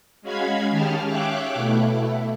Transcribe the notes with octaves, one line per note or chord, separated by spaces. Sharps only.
G#3 C#4 F#4 F5 B5 G#6
D#3 C#4 G4 G#4 A5 F6
C#5 E5 F5 G5 D6 F#6
B2 A3 E4